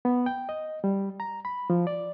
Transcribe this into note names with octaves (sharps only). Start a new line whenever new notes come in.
B3
G5
D#5
G3
A#5
B5
F3
D5